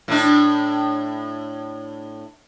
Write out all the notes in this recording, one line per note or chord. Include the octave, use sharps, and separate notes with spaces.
A2 D4